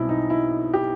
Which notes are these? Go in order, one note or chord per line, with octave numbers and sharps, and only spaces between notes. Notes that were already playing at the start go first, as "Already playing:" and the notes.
Already playing: B1 B2 G3 C4 E4
D#4
E4
G4